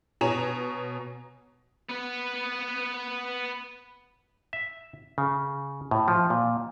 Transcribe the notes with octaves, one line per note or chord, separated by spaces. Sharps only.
B2 C#5 G#5 A#5 E7 F7
B3 B4
E5
C#3
A2
F3
A#2